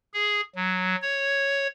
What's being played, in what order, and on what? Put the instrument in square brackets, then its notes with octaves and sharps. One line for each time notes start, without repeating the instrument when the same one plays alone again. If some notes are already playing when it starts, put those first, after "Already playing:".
[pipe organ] G#4
F#3
C#5